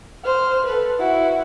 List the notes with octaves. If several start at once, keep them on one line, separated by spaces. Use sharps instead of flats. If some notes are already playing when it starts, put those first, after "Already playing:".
C5 F6
A4 B4
E4 F#4